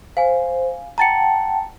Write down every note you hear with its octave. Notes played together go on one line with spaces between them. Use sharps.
C5 F5 G#5
F#5 G5 A5 A#5 A6 C#7